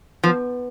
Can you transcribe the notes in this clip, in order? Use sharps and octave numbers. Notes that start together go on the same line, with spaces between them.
F3 B3